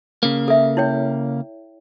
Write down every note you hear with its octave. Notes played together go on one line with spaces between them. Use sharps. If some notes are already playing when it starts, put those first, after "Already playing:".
C#3 A#3
A4 E5
E4 C#5 G5